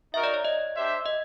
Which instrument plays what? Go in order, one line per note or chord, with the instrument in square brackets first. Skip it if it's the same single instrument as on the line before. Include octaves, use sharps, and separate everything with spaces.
[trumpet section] D#4 F#4 A#4 D#5 [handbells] E5
[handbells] D5
C#5
D#5
[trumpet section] D4 G4 C5 E5
[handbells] D#5